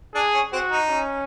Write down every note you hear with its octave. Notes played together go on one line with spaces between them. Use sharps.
D4 G#4
C#4
C4 F#4
D#4
C#4